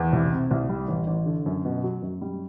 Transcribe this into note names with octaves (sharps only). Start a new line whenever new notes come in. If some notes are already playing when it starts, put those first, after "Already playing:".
Already playing: E2
C2
C3
C2
G3
A1
A1
D3
F#2
B2
F#3
F#2
G3